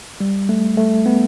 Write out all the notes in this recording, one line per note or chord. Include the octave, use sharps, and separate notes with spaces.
G3
A3
A3
B3